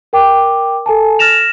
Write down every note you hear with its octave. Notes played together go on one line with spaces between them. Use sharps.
A#4 G5 D6
A4 G#5 A5
F6 A6 A#6 E7 F7